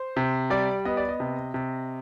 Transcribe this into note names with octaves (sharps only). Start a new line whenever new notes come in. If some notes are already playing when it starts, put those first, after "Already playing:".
Already playing: C5
C3
G3 D5
B3 D#5
D5
D#5
C3
C3